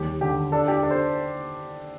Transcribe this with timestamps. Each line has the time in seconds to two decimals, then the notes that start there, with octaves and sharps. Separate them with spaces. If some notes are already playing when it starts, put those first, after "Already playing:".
Already playing: D#2 G3 G4
0.21 D3 G4
0.52 D4 A4
0.68 G4
0.83 D4 A4
0.91 C5